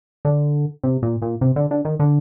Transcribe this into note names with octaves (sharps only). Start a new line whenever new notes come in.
D3
C3
A#2
A#2
C3
D3
D3
D#3
D3